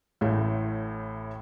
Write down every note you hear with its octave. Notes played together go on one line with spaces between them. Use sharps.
A1 A2 A3